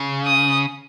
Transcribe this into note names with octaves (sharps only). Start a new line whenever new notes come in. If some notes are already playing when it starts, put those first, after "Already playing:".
Already playing: C#3
D#6